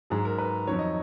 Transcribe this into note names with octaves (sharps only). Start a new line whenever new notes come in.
G#2 F#3 G#4
A#4
B4
F2 D#3 F#3 C#5
D#5